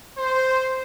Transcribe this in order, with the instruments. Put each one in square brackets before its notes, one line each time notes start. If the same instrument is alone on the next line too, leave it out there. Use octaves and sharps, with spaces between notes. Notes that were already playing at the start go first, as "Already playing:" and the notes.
[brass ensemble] C5